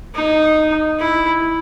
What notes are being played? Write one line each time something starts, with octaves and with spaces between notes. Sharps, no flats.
D#4
E4